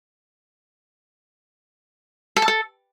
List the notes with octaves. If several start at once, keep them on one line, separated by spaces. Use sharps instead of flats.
A4
A5
A4